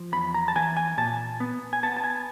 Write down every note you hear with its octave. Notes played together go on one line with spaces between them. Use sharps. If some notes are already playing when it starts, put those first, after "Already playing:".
Already playing: F3
E2 B5
A#5
A5
E3 G#5
G#5
A#2 A5
B3
G#5
B3 A5
A5
G#5